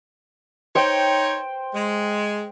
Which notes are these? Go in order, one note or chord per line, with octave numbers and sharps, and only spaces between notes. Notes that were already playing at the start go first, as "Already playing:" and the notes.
D#4 C5 C#5 G5
G#3